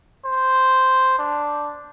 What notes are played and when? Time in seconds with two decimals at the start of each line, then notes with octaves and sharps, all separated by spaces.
0.25 C5
1.18 D4